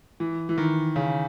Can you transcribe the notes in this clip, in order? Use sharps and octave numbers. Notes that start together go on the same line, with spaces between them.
E3
E3
D#3
C#3